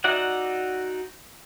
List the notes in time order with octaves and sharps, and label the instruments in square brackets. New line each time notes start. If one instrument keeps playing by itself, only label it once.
[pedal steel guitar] D#4 F#4 D5 E5 F#5